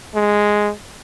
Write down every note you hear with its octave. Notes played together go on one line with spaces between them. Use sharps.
G#3